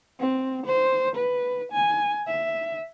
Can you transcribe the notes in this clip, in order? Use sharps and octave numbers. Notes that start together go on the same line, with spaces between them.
C4
C5
B4
G#5
E5